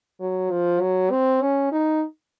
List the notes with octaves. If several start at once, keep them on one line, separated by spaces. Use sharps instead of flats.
F#3
F3
F#3
C4
C#4
D#4